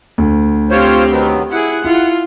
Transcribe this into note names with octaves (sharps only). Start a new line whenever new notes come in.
D2
C4 F4 G4 C5 C#5
D#3 F#3 B3
E4 G#4 F#5
E4 F4